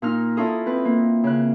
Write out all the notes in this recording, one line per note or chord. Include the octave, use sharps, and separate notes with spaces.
A#2 D#4 F6
C#4 E4 F4 A4 D#5 D#6
C4 B4
A#3
C#3 F#6